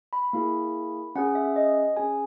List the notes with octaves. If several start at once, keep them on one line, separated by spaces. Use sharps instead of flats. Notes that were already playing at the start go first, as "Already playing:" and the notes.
B5
A#3 E4 G#4
C#4 G#4 F#5
E5
D#5
C#4 G#4 G#5